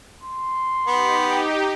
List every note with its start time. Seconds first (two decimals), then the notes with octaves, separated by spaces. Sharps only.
0.23 C6
0.87 B3 D#4 G4